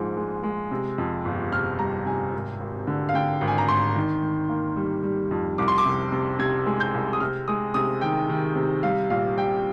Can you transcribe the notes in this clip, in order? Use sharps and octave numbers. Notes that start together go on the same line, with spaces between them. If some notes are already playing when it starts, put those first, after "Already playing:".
Already playing: A#1 G#2 F3 G#3
G#3
G#3
C3
F2
G1
C3 F6
G3 A#5
C3 G#5
G#1
G#1
D3
F5
D3 G5
G#1
G#5
A#5
G#1 C6
D#3
D#3
A#3
G3
G3
F2
C2 D6
C6
D6
C3
C3
C3 G#6
G#3
G6
C2
D#6
C3 F6
G#3 D#6
C3 D#6
D#3 G5
D#3
C3
G3 F5
A#1 F5
G3 G5